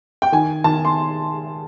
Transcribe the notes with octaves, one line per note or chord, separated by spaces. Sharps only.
G5
D#3 G#5
D#3 A5
C6